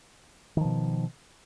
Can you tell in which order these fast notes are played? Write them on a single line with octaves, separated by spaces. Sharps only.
D#3 F3 B2